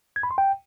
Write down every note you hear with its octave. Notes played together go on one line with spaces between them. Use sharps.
G#6
B5
C6
G5